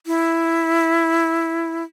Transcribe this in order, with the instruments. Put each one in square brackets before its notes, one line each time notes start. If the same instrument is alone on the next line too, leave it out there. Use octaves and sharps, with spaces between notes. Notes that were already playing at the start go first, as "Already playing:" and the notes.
[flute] E4